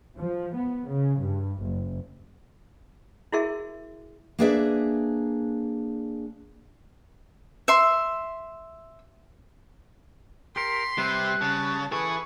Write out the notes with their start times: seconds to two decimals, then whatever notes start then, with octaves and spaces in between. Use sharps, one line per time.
0.17 F3
0.56 B3
0.88 C#3
1.21 G2
1.62 F#1
3.32 E4 F#4 G#4 A#4 E5
4.39 A#3 D4 G#4 B4 D5 E5
7.68 E5 C6
10.56 G4 A#4 C6 B6
10.98 C3 G3 B4 G5 F#6
11.41 C#3 A5
11.92 E3 E4 G#4 A4 B4 C#6